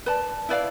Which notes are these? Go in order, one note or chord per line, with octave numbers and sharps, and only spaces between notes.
B4 D5 A5
E4 B4 D5 F5